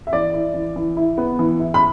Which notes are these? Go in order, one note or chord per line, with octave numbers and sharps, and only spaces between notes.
E5
E3 D5
E4
E3
E3
E4
B3
E3
E4
B5